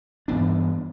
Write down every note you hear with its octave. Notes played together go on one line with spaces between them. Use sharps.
G2 E3 B3 D4